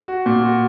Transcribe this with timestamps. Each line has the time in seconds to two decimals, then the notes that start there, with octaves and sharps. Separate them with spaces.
0.08 F#4
0.26 A#2
0.43 F#4